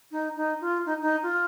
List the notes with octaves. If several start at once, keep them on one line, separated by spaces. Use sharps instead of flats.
D#4
D#4
F4
D#4
D#4
F4